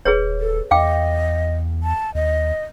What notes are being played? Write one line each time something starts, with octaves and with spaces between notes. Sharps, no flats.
D#1 G#4 B4 C#5
A4
E2 D#5 F5 G5 D6
A5
D#2 D#5